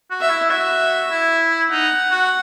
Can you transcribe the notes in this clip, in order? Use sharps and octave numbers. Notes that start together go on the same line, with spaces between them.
F#4
E5
E4
F#4 E5
E4
D#4 F#5
F#4